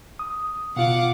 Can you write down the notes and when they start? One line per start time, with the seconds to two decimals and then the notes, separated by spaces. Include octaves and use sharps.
0.19 D#6
0.76 B2 F4 F5 F#5 D6